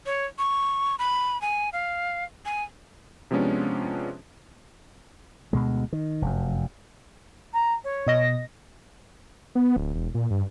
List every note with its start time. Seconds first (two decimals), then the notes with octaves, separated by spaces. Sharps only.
0.06 C#5
0.39 C#6
0.99 B5
1.42 G#5
1.73 F5
2.46 G#5
3.31 C3 F3 G#3 B3 C#4 D4
5.53 D2 B2 G#3
5.93 D#3
6.22 F1 F#2
7.53 A#5
7.84 C#5
8.07 B2 D#5 A#6
9.55 B3
9.76 D1
9.95 E1
10.14 A#2
10.31 G2